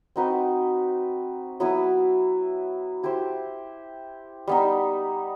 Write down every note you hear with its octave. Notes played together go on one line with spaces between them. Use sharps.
C4 D#4 F#4 B4
F#3 B3 E4 B4
E4 G4 C5
G3 B3 D#4